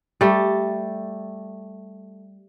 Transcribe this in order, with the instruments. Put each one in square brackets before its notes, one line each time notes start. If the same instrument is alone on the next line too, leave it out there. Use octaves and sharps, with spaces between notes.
[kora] G3 A3